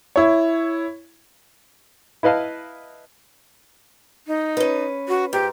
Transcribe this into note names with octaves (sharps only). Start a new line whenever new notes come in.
E4 C#5
E4 B4 D#5 F5 A5
D#4
C#4 B4
F#4
G#2 G4